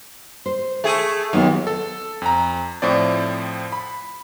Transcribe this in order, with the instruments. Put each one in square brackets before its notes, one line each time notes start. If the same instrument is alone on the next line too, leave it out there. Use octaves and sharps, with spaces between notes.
[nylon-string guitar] C5
[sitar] A3 G#4
[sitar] D#2 [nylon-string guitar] F#3 B3 F4
[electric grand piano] A4
F2 A#5
A2 F3 C4 D5
B5